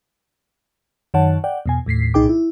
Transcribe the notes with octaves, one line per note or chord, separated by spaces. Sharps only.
F#2 D#3 C#5 F#5 A5
D5 F#5 G5
E2 B2 G#5
D#2 A2 B6 C7
C2 A#2 D#4 G#4 G5 D6
E4